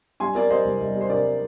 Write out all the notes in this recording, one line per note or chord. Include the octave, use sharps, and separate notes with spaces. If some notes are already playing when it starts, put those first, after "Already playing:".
G3 G#5 C6
C4 A#4 D5
G3 C5 D#5
C2
C2
G3
C5
C3 A#4 D5